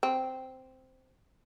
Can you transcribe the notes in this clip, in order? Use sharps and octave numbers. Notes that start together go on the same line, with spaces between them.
C4